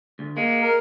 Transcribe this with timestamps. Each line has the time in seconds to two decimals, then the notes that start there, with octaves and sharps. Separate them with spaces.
0.19 D2
0.37 G#3 A#3
0.63 A#4